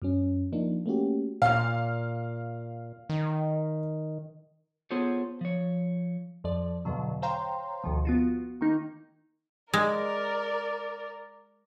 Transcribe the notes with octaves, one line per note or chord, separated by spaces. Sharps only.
F#2 F#3 C#4
F3 A#3 D4 D#4
A3 A#3 C#4 F#4 G4
A#2 F5 F6
D#3
B3 F4 G#4 A4 C5 C#5
F3 C#5
F2 F3 D5
E2 G2 B2 D3 F#3
C5 C#5 F5 G5 A#5 C6
D2 B2 D#3 F3
B3 F4 F#4
D#3 A#3 D#4
G#3 A#4 D5